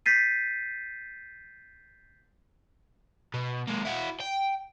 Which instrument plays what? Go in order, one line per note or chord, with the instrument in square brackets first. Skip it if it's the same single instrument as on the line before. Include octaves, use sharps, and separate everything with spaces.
[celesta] G6 A6 B6 C7 D#7
[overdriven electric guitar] B2
G#3 A#3
E4 F#4
G5